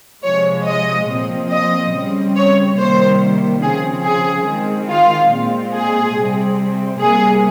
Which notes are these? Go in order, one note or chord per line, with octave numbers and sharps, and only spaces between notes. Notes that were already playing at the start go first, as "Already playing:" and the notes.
C3 F3 G#3 C#5
D#5
A#2 F3 C4
D#5
C#3 G3 C4
C#5
C3 D#3 G3 A#3 C5
C#3 F3 C4 G#4
G#4
D#3 G#3 C4
F4
A#2 G#3 C4
G#4
C3 G3 C4
C3 G3 A#3 G#4